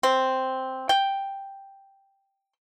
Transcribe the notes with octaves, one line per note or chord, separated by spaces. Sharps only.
C4
G5